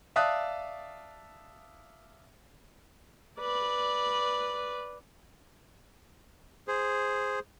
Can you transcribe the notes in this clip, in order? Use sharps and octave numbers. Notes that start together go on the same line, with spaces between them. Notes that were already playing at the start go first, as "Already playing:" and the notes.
D5 E5 F5 A5 D#6 F#6
B4 D5
G#4 C5